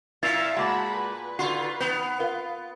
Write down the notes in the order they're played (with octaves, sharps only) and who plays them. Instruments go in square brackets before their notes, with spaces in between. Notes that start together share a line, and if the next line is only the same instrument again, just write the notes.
[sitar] A#2 [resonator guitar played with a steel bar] E4 [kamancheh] E5 F5 [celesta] A6 C7 F7
[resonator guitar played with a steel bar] G#3 A#3 A5 [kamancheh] F#4 B5
[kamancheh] B4
[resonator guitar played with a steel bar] D3 D#3 F#4 [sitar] F4 [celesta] C6 C#6 C7
[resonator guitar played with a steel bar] D#3 [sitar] B3 [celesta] G6 C7
[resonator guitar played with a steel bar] F4 [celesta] A#4 F5